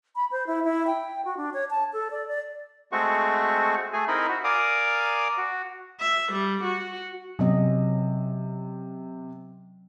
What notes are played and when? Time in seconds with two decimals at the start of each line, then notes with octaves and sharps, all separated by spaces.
0.16 B5
0.31 C5
0.47 E4
0.64 E4
0.87 G5
1.25 F#4
1.37 D4
1.53 C#5
1.70 A5
1.93 A4
2.11 D5
2.28 D5
2.92 G#3 A3 C4 F#4 C#6
3.93 A3 G#4 G#5
4.08 C4 D#4 E4 A#4 D#5 B5
4.29 F#4
4.44 A#4 D5 F5 G#5 D6 D#6
5.37 F#4
6.00 E5
6.32 G3
6.64 F#4
7.39 C3 F#3 C#4 D#5